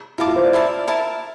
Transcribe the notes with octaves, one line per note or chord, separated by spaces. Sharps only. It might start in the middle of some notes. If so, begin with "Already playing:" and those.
E4 A#4 F5 A5 D6
F4
C5
D5
E4 A#4 E5 A5
E4 A#4 E5 A5